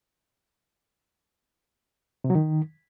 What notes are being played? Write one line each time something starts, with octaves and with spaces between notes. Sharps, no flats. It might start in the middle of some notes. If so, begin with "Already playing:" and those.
C3
F#3
D#3